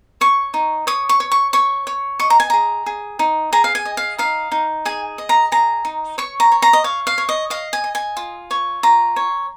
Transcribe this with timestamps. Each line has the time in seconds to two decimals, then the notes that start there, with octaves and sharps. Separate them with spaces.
0.21 C#5 C#6
0.54 D#4
0.87 C#5 D#6
1.09 C#6
1.20 C#5
1.32 C#6
1.53 C#5 C#6
1.87 C#5
2.20 D#5 C#6
2.30 A#5
2.40 G#5
2.50 G#4 A#5
2.86 G#4
3.19 D#4
3.52 G#4 A#5
3.64 F5
3.75 G#5
3.85 D#5
3.97 F5
4.18 D#4 F5
4.52 D#4
4.85 G#4 G#5
5.18 D#5
5.29 A#5
5.52 G#4 A#5
5.85 D#4
6.18 C#5 C#6
6.40 A#5
6.52 C#5
6.62 A#5
6.73 D#5
6.84 C#5 F5
7.07 F5
7.18 C#5
7.29 D#5
7.50 D#5 F5
7.73 G#5
7.84 D#5
7.95 G#5
8.17 F4
8.51 C#5
8.83 F4 A#5
9.16 C#5